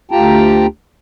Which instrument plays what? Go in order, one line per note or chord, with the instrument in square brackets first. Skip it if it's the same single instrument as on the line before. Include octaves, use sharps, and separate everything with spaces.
[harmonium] D2 F4 G4 G5 A5 A#5